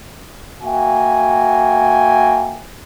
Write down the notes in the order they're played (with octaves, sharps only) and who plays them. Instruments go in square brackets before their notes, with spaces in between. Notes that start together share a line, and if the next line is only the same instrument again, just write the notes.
[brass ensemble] A#3 F#4 E5 G5 G#5